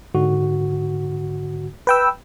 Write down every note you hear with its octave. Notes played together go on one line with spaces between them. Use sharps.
G#2 D3 F#4
B4 G5 E6